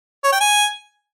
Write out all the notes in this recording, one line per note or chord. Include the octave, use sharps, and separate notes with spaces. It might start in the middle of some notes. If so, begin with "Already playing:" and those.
C#5
G5
G#5